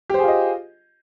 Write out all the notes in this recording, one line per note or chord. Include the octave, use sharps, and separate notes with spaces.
F4 G4 G#4 C5 D#5